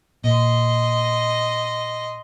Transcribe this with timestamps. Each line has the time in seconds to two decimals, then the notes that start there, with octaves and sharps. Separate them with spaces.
0.24 A#2 D#5 C6